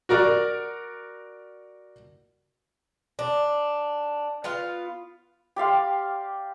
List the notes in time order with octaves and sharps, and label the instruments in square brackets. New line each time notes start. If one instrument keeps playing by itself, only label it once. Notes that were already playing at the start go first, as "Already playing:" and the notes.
[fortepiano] F#4 A#4 D5
[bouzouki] D4
B3 F4 F5
[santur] G4 D5 F5 C6